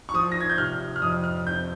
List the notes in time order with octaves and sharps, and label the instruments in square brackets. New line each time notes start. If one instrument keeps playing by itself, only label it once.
[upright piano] C#6
[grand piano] F3 [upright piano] D#6
[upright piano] A#6
G#6
G6
[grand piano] C3 [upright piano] F6
[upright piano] F6
[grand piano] F2 [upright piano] D#6
[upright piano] F6
[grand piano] C4 [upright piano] G6